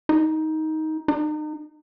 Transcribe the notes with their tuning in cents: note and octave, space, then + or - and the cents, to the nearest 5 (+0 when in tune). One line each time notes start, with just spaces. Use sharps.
D#4 +15
D#4 -35